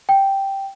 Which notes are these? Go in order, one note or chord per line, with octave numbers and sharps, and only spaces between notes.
G5